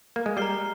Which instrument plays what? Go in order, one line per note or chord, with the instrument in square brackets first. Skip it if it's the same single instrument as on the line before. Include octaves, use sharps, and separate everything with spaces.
[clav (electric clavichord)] A#3
G#3
[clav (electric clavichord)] G3 [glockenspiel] A#5 F6 C7 G7